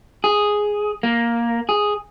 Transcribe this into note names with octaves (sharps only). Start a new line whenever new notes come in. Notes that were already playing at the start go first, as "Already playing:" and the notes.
G#4
A#3
G#4